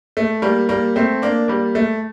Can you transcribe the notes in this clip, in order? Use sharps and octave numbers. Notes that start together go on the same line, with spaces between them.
A3
G3 A#3
G3 A#3
A3 C4
A#3 D4
G3 A#3
A3